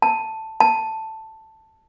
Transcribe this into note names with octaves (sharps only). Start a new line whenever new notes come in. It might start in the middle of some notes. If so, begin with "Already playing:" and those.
A5
A5